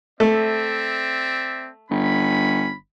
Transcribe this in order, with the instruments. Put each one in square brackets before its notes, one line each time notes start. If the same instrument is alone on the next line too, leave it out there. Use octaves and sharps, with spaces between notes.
[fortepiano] A3 [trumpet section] C4 D5 E5
[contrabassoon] G1 [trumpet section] C#4 B5